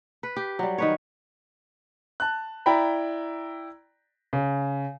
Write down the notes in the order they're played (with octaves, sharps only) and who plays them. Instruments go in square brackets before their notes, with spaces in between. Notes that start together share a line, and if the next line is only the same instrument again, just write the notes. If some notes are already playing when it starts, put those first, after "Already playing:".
[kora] B4
G4
F#3 G3
D#3 B4 C#5
[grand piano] A5 F#6
E4 D5 G5 A#5 B5
C#3